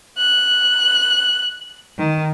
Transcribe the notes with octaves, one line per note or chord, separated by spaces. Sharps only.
F#6
D#3